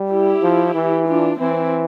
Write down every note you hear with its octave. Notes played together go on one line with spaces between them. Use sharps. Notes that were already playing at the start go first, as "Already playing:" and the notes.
Already playing: G3
E4 G4
F3
E3
D4 F4
E3 C4 E4